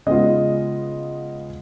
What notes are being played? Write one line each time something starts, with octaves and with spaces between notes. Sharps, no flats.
C#3 G#3 B3 F4 D#5